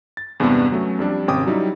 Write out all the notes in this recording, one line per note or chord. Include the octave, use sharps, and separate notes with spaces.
A6
E2 G2 C3 G#3 B3 D4
F#3 A3 C#4
F2 G3 D4
G#1 C3 C#4 G5 D6 D#6
F#3 G3 D#4 E4